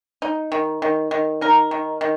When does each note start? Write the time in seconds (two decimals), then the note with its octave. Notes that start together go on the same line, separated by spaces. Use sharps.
0.22 D#4
0.52 D#3
0.82 D#3
1.11 D#3
1.41 D#4 A#4
1.71 D#3
2.01 D#3